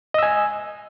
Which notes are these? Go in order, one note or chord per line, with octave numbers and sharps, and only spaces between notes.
D#5 G#5 E6